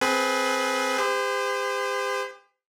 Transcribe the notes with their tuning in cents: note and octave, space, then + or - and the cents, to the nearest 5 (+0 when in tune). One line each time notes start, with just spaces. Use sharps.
C4 +0 G#4 +25 B4 +0
G4 +40 C5 -35